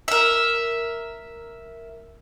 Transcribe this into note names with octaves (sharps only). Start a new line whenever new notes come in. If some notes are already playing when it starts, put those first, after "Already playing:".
A#4 E5